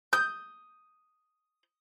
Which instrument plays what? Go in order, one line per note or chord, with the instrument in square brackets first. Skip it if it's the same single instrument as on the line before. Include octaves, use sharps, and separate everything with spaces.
[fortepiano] D#6 [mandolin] G6